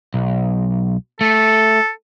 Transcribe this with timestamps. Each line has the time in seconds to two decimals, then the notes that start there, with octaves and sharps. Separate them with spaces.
0.14 B1
1.21 A3 A4